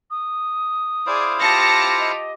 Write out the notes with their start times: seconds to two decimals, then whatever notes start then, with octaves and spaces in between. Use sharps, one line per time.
0.11 D#6
1.07 E4 G#4 C5 D5 F5
1.39 F4 G4 A5 A#6 C#7
1.99 D#5